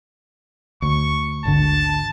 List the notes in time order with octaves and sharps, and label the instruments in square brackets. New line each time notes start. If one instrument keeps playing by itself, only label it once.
[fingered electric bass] D2 [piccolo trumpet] C#6
[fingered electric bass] G#1 D2 D3 [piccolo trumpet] A5